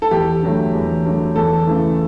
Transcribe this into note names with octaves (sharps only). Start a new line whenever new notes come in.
A4
E2 G4
D3 F#3 A3
E2
D3 F#3 A3
E2 A4
C#3 E3 A3